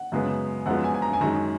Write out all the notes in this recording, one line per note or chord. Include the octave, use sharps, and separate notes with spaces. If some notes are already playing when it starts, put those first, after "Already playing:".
Already playing: F#5
F#2 C#3 G#3 B3
F#2 F3 G#3 B3 F#5
G#5
G#5
A#5
G#5
F#2 D#3 G#3 A#5